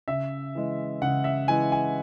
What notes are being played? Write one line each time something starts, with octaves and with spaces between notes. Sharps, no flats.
C#3 E5
E3 G#3
C#3 F#5
E5
E3 G#3 G#5
G#5